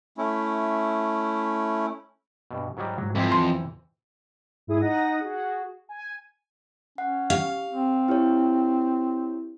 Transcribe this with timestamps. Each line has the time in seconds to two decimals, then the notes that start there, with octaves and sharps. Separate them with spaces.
0.18 A3 C#4 E4
2.51 G2 B2
2.77 G#2 F#3 G3
2.98 G#2 F#3 G3
3.15 F2 E3 C4
3.32 E2 C6
4.67 G#2 E4 G#4 D#6
4.81 D#4 F#5 D#6 A#6
5.20 F#4 G#4
5.89 G#5
6.98 C#4 F#5
7.30 G4 F5
7.72 C4
8.08 E4 G4 C#5